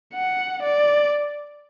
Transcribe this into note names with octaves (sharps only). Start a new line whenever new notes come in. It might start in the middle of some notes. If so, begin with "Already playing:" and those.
F#5
D5